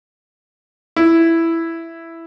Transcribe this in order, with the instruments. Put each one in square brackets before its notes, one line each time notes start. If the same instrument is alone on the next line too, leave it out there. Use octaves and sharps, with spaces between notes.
[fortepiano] E4